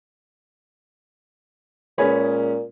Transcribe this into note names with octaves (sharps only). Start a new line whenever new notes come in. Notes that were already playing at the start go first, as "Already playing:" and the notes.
A#2 G#3 C#4 G#4 B4 C#5